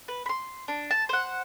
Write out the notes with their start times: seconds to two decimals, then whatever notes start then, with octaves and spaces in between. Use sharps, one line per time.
0.08 B4
0.26 B5 C6
0.68 D4
0.91 A5
1.09 C5 F#5